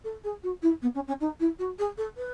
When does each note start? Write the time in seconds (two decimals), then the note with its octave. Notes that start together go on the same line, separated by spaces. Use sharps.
0.04 A4
0.24 G#4
0.43 F#4
0.62 E4
0.82 B3
0.95 C#4
1.08 C#4
1.20 D#4
1.40 E4
1.59 F#4
1.79 G#4
1.97 A4
2.17 B4